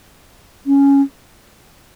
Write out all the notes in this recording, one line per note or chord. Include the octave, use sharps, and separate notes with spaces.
C#4